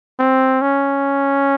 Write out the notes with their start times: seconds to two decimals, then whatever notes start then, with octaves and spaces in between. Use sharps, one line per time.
0.19 C4
0.61 C#4